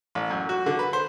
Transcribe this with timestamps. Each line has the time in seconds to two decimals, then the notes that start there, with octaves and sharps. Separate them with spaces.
0.15 A1
0.30 F#2
0.49 F#4
0.66 D3
0.79 B4
0.93 C5